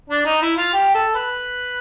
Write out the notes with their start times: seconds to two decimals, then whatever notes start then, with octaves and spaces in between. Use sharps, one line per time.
0.10 D4
0.26 D#4
0.42 E4
0.57 F4
0.73 G4
0.94 A4
1.15 B4